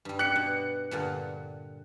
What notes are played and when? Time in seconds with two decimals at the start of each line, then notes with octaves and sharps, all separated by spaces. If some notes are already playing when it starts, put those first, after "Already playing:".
0.05 G2 G3
0.19 G4 F#6 C#7
0.36 B2
0.91 G2 A#2 D3